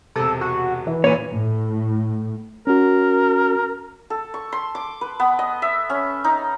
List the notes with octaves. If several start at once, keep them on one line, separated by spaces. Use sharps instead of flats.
E1 C3 A4
F#4
E3
F#2 A#2 B4 C#5
A2
C#4 F#4 A#4
A4
C#6
C6
D6
B4
B3
D#5
E5
C#4
D#4